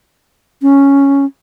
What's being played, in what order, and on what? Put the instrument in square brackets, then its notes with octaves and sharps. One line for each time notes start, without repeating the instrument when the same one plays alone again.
[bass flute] C#4